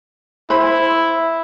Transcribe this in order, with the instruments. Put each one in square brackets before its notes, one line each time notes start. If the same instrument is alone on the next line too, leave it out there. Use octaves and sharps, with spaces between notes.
[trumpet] E4 [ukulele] C5 B5